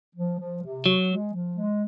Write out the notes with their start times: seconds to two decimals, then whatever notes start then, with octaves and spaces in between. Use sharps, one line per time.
0.16 F3
0.39 F3
0.63 C3
0.86 F#3 F#4
1.09 G#3
1.33 F3
1.56 G#3